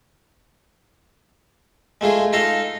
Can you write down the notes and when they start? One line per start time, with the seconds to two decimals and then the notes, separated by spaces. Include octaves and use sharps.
2.01 G#3 A3 F4 G#4
2.33 D#4 F4 A4 D#5 F5